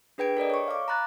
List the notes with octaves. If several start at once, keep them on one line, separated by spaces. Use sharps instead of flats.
D4 G#4 B4 G5 G#6 D7
A4 A#4 D5 D#5
C#5 C#6
F5 D6
A#5 B5 F#6 A6